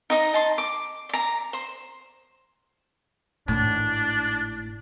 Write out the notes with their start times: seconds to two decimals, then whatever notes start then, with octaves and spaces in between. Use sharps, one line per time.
0.10 D#4 D#5
0.34 A5 C6
0.58 D6
1.09 D5 A#5
1.53 C5
3.48 G#1 A2 D4